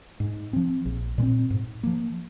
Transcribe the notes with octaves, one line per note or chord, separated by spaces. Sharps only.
G#2
F3 C4
A#1
A#2 G#3 C4
G#2
F3 A#3